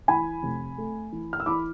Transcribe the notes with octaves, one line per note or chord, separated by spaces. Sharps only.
E3 G#5 B5
F1
A3
E3
F6
E6
E3 B5 D6